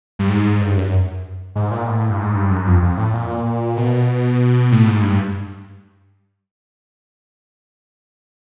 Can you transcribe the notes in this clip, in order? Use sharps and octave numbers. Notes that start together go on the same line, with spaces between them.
G2
G#2
G2
F#2
G#2
A#2
A2
G2
G#2
G2
F#2
F2
F2
A2
A#2
B2
A2
G#2
G2